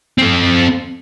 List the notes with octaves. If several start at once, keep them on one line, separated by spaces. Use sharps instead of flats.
C4 A4